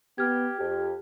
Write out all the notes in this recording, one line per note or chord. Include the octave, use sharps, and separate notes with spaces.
B3 G4 F6 G#6
F2 G4